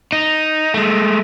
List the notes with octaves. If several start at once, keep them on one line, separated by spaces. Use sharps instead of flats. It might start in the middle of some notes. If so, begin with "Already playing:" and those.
D#4
G#3 A3